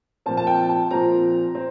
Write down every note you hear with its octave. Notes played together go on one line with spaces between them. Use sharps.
A#2 F3 C4 A5
A5
G5
A5
A#2 F3 C4 A#5
C4